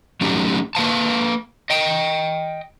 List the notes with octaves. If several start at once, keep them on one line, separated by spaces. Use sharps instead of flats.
F#3 A3 C#4 D#4 G4
A#3 B4 F5 A5
D#5 G5